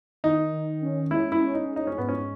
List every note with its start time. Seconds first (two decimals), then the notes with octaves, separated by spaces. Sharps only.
0.24 D#3 D#4
0.52 D#3
0.81 C#4
1.10 G#3 E4
1.32 E4
1.40 C#4
1.54 D#4
1.69 G#3
1.76 D#4
1.87 C#4
1.98 G#2 B3
2.09 C#4